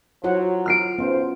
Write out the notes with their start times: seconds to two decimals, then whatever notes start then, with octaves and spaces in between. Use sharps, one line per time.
0.24 F#3 E4 F4 C5 F#5
0.66 F6 C7 D7
0.98 B1 C#3 B3 C#4 C5